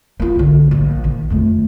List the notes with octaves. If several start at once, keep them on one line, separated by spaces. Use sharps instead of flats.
A#3 F4
B1 D3
A#1
D#3
F2 A3